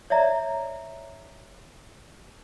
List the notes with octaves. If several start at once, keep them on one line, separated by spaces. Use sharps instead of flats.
C#5 D5 E5 A#5